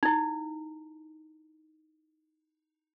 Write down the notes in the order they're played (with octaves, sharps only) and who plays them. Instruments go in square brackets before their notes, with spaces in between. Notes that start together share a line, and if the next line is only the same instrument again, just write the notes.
[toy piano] D#4 E4